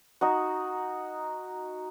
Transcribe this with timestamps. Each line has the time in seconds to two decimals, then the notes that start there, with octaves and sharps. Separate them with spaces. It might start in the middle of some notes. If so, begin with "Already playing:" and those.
0.21 D#4 F#4